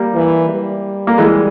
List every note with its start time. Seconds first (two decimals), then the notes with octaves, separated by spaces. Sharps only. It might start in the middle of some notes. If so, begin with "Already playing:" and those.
Already playing: G3 A#3
0.15 E3
0.49 G3
1.07 A#3
1.18 E3 G#3